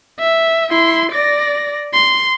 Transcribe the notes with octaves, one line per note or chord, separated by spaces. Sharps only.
E5
E4 C6
D5 A#6
C6